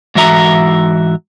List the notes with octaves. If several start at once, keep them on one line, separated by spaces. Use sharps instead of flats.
G#2 E3 F#4 E5 A#5